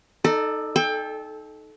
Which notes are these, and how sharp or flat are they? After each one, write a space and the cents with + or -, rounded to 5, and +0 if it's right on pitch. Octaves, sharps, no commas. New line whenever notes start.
D#4 -5 A4 +0 D5 +40
A4 -20 G5 +25